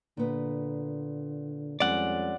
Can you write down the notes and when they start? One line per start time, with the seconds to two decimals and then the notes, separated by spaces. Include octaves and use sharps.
0.17 A#2 D3 B3
1.80 F2 G3 G#3 C#4 D5 F#5